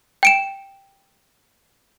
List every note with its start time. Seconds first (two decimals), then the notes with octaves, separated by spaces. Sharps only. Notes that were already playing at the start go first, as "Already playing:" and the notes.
0.23 G5 D7 E7